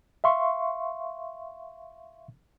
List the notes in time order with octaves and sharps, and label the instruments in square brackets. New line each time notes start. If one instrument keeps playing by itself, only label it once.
[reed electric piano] E5 F5 C6 C#6